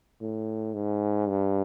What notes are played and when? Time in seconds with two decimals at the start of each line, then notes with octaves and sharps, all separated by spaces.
0.21 A2
0.74 G#2
1.28 G2